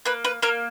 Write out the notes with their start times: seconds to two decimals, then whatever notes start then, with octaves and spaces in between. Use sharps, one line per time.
0.05 A#3 B4
0.25 B4
0.42 A#3 A#4